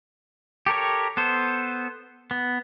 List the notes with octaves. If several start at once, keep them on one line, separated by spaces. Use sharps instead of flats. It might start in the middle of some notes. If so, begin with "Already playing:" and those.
G4 A4 A#4 C#5
B3 A4 C5
B3